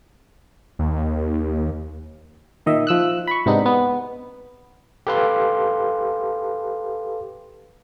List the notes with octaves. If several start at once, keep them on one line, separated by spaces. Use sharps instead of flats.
D#2
A#2 D#3 D#5 E5
F3 E6 F#6
B5 C#6
G#2 C3 B3 C4 D4 D#4
B3
G4 A4 B4 F5 C6